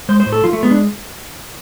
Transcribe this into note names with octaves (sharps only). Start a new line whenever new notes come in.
G#3 C5
C5
A2
A4
F3 F4
A3
G#3 B3
D4